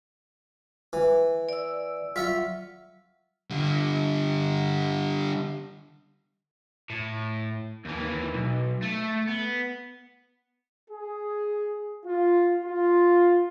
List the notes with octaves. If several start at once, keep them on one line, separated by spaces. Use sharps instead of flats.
E3
D5 E6
F#3 F4 E5 C#6
D3 G3
A2
D#2 E3
B1
A3
B3
G#4
F4
F4